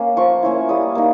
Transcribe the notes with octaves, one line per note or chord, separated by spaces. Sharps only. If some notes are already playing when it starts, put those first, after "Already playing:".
Already playing: A#3 C#4
F3 C#6
A#3 C#4 E4
G3 D#6
A#3 D#4